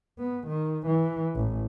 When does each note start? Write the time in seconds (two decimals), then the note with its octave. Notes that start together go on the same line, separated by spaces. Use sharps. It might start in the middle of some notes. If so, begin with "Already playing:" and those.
0.19 B3
0.48 D#3
0.87 E3
1.36 A1